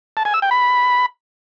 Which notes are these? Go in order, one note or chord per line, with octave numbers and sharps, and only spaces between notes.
A5
G#5
E6
G5
B5